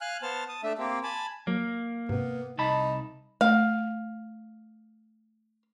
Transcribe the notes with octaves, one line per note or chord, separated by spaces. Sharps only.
F5 G#5 F6 F#6
B3 C5 A5 F6
A5 D#6
A3 D4 E5
A#3 C4 G4
G#5 A5 B5
F#3 A#3
G#2 C3 B3
C2 D#4 A5 B5
A3 F5